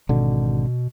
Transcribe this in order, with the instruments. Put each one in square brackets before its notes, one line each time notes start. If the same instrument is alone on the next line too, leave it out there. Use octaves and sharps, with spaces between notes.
[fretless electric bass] G#1 D3 [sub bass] B2